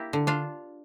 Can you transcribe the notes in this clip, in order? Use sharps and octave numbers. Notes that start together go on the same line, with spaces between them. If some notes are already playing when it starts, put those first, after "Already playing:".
Already playing: A#3 E4 G4
D3
D4 F4